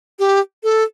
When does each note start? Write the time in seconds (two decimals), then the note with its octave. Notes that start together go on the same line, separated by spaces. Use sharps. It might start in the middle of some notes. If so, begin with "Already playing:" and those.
0.19 G4
0.63 A4